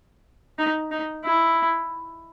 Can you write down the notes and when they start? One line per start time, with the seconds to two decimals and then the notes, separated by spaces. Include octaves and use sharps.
0.58 D#4
0.91 D#4
1.25 E4